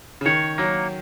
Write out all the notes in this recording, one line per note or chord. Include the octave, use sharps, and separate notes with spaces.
C#3
D#3 C#5
F#3 A#3